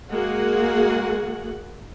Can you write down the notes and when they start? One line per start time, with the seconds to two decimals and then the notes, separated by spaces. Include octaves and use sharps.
0.10 G#3 A#3 F#4 G#4 F#5